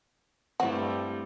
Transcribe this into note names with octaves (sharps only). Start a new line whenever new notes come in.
G2 G3 A3 C4 E4 F#4